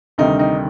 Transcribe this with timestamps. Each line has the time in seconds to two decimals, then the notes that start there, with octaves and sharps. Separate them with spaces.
0.18 D2 C3 D#3 G3 D#4
0.39 D#4